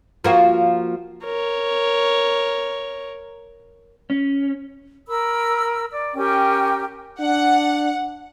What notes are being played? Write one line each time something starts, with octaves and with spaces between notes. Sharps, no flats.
F3 A#3 F#4
A#4 C#5
C#4
A#4 B5 E6
D5
C#4 G4 A#4 G5
D4 F#5